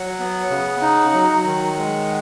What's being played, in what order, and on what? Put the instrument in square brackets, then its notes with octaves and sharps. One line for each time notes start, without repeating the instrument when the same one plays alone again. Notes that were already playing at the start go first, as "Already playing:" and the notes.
Already playing: [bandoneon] F#3 F#5
B3
C#3
D#4
F#3
D#3
G#3